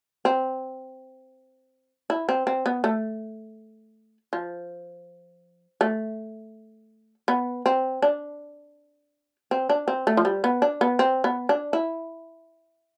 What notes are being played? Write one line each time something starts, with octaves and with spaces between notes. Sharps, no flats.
C4
E4
C4
C4
B3
A3
F3
A3
B3
C4
D4
C4
D4
C4
A3
F3
G3
B3
D4
B3
C4
B3
D4
E4